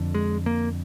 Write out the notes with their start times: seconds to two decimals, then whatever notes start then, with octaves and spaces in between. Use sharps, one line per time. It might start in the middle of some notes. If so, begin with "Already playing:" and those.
Already playing: F2 D3
0.14 G#3
0.46 A#3